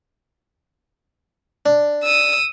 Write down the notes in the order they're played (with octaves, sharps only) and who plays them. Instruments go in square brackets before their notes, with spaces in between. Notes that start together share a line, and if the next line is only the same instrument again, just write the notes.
[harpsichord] D4
[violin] D#6 E6